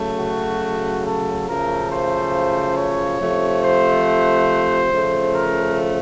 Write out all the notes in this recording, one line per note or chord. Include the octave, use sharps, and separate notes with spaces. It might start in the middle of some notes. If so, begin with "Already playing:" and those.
Already playing: C#3 F#3 A3
F#4
A4
F#2 C#3 F3 A3 A#4
C5
C#5
C3 F3 A3
C5
C#3 F3 A3
A#4